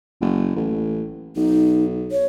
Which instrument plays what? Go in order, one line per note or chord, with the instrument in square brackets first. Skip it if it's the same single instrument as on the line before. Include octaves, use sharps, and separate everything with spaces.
[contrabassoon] F#1
A1
[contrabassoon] B1 [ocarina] D#4
[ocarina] C#5